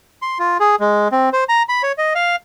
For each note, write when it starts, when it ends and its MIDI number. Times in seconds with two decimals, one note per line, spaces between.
0.22 0.38 84
0.39 0.57 65
0.60 0.76 68
0.80 1.08 56
1.12 1.29 60
1.33 1.44 72
1.49 1.63 82
1.69 1.82 83
1.83 1.92 73
1.98 2.13 75
2.15 2.36 77